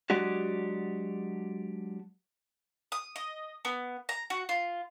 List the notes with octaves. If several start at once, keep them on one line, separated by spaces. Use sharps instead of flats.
F#3 G#3 D4 F#4 G4
D#6
D#5
B3
A#5
F#4
F4